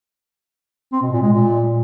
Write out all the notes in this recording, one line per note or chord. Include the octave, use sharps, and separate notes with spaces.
C4
B2
A#2
G#3
A#2